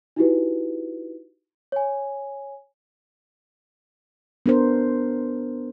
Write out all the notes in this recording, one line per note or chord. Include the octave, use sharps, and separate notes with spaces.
D#4 E4 F#4 G4 B4
C#5 G#5
B3 D4 A#4 C5